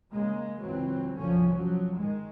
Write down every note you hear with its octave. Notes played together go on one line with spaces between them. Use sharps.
C#3 G#3 A#3
C#2 E3 F#3 C4
F#1 C2 D3 F3 C#4
F3 F#3
D#3 G#3